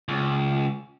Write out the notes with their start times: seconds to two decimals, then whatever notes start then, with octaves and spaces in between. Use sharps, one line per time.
0.08 C#2